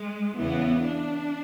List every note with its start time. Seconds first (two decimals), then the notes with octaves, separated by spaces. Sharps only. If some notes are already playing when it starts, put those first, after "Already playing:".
Already playing: G#3
0.37 E2 C#3 E3 B3
0.85 D4